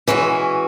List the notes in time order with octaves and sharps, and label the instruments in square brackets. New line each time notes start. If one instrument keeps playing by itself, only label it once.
[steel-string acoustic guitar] E3 G#3 C#4 F#4